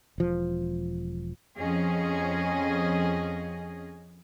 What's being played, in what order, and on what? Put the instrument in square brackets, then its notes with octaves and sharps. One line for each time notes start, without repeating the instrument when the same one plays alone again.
[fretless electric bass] E1 F3
[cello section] F2 C#4 G#4 D#5